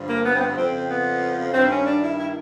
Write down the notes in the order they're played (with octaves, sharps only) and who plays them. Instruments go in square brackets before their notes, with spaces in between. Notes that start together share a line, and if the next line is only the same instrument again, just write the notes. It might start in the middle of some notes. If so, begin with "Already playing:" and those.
Already playing: [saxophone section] G2 D3 F3
A#3
B3
C4
B3
F2 C#3 F3 C4
C4
B3
G2 D#3 C4
C#4
D4
E4
E4